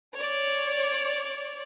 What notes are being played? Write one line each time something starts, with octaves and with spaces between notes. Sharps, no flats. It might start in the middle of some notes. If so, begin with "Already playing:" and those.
C#5 D5